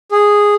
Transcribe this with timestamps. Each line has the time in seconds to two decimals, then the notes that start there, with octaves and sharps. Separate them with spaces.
0.11 G#4